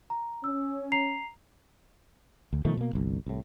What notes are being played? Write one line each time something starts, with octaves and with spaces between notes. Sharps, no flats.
A#5
C#4 E6
A#5 C7 F7
D2
B2 D#3 F3 A3
B2 A#3
G1 C2
C2 A2